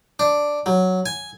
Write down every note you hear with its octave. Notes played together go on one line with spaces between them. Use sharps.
D4
F#3
G#5